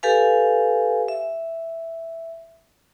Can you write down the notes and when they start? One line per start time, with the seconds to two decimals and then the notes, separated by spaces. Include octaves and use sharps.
0.03 G4 A4 B4 F5 G#5
1.08 E5